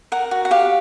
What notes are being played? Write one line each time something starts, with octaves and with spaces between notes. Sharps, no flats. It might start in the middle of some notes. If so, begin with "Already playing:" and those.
A#4 F#5
F#4
F#5
G4 F5